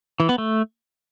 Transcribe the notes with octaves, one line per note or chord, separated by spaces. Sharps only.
E3
B3
A3